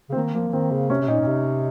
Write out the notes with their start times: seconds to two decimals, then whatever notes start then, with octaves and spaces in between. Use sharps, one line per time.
0.09 C#3
0.12 C4
0.16 D#3 A#3
0.34 F3 A#3
0.49 F3
0.53 D#3 C4
0.71 C#3
0.90 C3 C#4
1.01 C3
1.08 A#2 D#4
1.21 A#2
1.27 C3